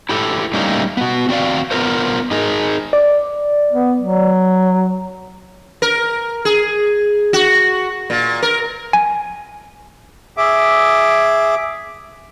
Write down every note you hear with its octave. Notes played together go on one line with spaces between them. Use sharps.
E4 G4 A4
G3 A3 A#3 C#4 D#4
B3 F#4
C4 F#4 D5 F5
B3 F4 A#4 C5
D#4 G#4 A#4
D5
B3
F#3
A#4
G#4
F#4
A#2
A#4
G#5
G#4 E5 D6